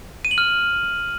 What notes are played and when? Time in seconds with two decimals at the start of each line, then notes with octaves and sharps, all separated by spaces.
0.25 D#7
0.31 F#7
0.38 F6